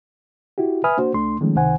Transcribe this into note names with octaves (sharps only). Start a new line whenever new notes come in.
E4 F#4 G4
B4 E5 G#5 B5 D#6 F6
A#3 D4 F#4 C5
C2 A3 D4 C6
D#3 F3 G#3 A3 C#4
C#2 C3 D#3 C5 F#5 G#5